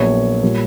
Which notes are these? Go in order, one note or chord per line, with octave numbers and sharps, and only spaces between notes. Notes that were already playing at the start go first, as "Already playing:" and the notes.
Already playing: A#1 A#2 F#3 B3 C#5
A#2 G3